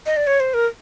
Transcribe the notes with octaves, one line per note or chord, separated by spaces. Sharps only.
D#5
D5
C#5
C5
A#4